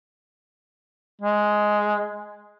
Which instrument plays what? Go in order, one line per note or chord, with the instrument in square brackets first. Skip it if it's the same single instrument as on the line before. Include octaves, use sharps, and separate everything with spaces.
[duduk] G#3